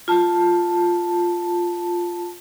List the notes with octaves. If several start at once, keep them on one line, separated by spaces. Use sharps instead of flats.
F4 A5